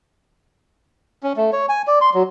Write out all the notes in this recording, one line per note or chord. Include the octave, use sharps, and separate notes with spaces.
C#4
A3
C#5
G#5
D5
C6
F#3